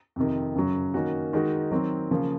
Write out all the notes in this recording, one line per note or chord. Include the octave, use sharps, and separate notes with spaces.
F2 C3 D#3
F#2 C#3 F#3
D#3 A#3 C#4 F#4
D#3 G#3 D#4 F#4
D#3 F#3 C4
C#3 F3 A#3